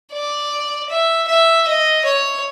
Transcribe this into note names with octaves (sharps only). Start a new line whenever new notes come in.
D5
E5
E5
D#5
C#5